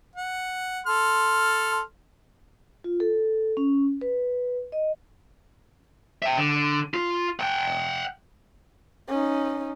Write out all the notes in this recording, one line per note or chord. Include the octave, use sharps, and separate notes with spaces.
F#5
A4 C6 F6
F4
A4
C#4
B4
D#5
E5 G5
D3
F4
F#5 G5
C#4 D#4